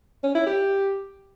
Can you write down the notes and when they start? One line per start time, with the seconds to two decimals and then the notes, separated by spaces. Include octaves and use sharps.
0.24 C#4
0.35 E4
0.46 G4